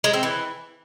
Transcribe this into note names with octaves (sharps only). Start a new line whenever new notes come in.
G#3
C4
E3